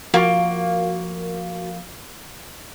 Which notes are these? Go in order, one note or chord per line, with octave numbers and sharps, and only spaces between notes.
F3 A#3 F4 F#4 A#4 C#6